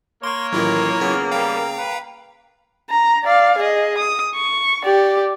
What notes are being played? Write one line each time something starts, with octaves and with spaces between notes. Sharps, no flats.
A#3 C#5 C6 C#6
A1 D#3 F#3 E4 F4
C#3 B3
G3 F5 G5 A#5
B4
A#5
D5 F5
G#4 D#5
D#6
C#6
G4 D5